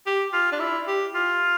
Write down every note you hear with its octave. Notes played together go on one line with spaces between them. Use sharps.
G4
F4
D4
E4
G4
F4